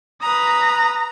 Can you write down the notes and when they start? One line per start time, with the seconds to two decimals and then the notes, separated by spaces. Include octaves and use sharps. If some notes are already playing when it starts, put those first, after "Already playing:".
0.22 B4 A#5 D#6